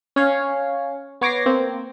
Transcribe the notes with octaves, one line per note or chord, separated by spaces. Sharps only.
C#4 C#5 F5
B3 C#5 D6 A#6 C7
A#3 C4